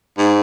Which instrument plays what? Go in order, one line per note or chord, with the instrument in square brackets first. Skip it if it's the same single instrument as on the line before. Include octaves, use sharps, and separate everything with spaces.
[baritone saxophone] G#2